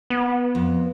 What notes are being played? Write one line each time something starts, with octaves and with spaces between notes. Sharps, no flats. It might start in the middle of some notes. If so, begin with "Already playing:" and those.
B3
F2